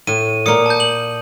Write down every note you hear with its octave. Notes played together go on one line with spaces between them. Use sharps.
A2 D#7
A#2 A#3 D#6 C#7
A5 G6
F#7